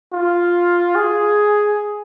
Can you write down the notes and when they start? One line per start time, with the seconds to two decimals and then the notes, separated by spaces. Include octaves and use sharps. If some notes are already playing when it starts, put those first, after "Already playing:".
0.13 F4
0.95 G#4